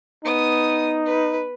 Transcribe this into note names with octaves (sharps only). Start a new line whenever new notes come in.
B3 D#4 D#6
B4